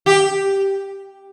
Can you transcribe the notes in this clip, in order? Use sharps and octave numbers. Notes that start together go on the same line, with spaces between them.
G4